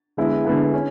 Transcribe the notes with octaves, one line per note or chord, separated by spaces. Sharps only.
D3 G#3 B3 E4
D3 G#3 B3 E4
C#4